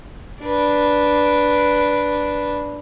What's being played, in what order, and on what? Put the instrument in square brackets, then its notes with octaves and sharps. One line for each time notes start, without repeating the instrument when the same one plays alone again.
[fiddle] D4 B4